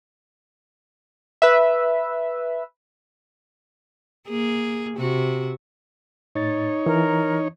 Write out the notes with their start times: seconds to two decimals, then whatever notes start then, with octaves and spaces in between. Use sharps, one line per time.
1.42 B4 E5
4.28 A#3 G#4
4.97 C3 F#4
6.35 A2 D#4 C#5 A6
6.86 E3 A#4